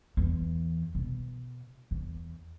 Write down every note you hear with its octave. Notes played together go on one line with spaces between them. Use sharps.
E2
B2
E2